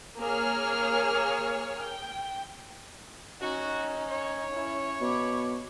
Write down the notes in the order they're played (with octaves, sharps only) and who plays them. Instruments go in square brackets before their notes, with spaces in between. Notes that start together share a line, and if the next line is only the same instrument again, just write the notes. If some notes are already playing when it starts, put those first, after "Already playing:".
[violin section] A#3 G#4 C#5 F6
G5
[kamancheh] C#4 D#4 [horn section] F#4
[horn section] C#5
[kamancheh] C#4 E4
[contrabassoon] B2 [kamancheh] B5 D6